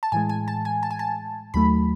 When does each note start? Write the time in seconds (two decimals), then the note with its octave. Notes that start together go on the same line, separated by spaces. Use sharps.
0.03 A5
0.12 A2 E3 G#3 G#5
0.29 G#5
0.48 A5
0.65 G#5
0.83 A5
0.91 G#5
0.99 A5
1.54 D#2 D#3 F#3 A3 B5